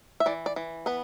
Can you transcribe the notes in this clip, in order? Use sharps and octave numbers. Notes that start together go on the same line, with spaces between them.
E5
E3 D5
D5
E3
B3 B4